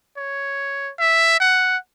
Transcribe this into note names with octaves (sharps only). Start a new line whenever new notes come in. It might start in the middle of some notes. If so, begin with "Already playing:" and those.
C#5
E5
F#5